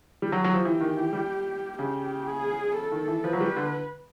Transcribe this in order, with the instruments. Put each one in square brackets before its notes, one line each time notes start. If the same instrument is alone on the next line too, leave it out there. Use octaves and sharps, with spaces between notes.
[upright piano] G3
[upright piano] F#3 [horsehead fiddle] G4
[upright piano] F#3
F3
E3
D#3
E3
G3
[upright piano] C#3 [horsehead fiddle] G4
[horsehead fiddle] G#4
A4
[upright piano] D#3
E3
[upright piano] F3 [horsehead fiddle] B4
[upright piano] F#3
G3
D3